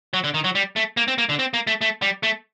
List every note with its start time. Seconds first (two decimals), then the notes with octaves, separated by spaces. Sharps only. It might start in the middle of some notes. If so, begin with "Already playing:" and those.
0.14 F#3
0.24 D3
0.34 D#3
0.44 F#3
0.55 G3
0.76 A3
0.97 A#3
1.08 C4
1.18 A#3
1.29 D3
1.39 C4
1.54 A#3
1.67 A3
1.81 A3
2.02 G3
2.23 A3